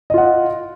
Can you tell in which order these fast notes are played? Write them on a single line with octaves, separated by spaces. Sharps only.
D#5 F4 F#5